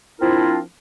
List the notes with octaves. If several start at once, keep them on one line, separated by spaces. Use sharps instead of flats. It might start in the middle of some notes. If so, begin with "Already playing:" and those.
F3 C4 D4 E4 F4 A#4